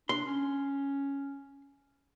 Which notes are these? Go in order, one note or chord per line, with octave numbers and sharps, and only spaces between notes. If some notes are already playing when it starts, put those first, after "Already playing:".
D4 C6
C#4